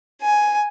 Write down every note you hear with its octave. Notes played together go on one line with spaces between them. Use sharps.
G#5